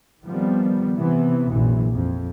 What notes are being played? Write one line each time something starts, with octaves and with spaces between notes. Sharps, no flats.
D#3 F3 G3 B3 C4
C3 E3 B3
A#1 F#2 C3 E3
F2